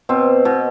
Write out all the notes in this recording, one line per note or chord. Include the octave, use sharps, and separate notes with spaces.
B2 C4
B2